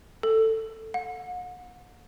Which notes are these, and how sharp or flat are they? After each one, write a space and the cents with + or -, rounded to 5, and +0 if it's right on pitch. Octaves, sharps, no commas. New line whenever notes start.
A4 +15
F#5 -40